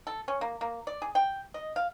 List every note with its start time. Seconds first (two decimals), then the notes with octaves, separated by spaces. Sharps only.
0.07 A4
0.28 C#4
0.41 A#3
0.61 A#3
0.87 D5
1.02 G#4
1.15 G5
1.54 D#5
1.76 F5